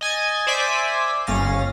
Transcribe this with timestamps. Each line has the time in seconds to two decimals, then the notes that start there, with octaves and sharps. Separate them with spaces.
0.01 D#5 G#5 G#6 A6
0.47 C5 D5 E5 G#5 D6 B6
1.27 G1 C#4 F5 A6 A#6